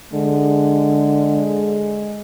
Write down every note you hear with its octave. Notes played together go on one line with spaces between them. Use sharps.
D3 G#3